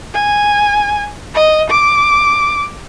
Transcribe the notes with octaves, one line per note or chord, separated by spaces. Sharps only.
G#5
D#5
D6